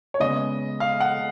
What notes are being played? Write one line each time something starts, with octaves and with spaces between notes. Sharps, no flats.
C#5
C#3 G#3 B3 D#5
F5
F#5